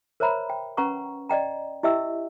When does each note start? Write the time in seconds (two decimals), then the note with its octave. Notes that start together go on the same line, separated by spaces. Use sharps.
0.20 A#4 C5 C#5 E5 A#5 B5
0.50 G5
0.77 C#4 B4 F#5 A#5 C#6
1.29 D5 D#5 G5 A#5
1.83 E4 G4 D#5 E5 G5 E6